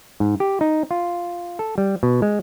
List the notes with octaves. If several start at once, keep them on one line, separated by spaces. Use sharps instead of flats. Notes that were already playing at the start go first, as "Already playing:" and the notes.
G#2
G4
D#4
F4
A4
G3
B2
G#3